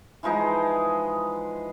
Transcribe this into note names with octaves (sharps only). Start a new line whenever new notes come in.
E3 F3 G#3 D#4